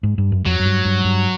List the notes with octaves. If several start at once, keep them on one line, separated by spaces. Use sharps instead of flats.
G#2
G2
F#2
F2 F#3
F#2
G2
G2
G2